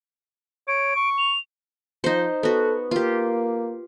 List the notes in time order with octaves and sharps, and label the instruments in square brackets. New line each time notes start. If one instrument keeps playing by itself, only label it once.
[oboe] C#5 [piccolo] D7
[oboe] C#6
[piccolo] F7
[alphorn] F3 [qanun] D#4 C5
[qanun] B3 F#4 [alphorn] A4
[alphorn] A#3 [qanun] F4 G4